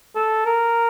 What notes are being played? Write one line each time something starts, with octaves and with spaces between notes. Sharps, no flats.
A4
A#4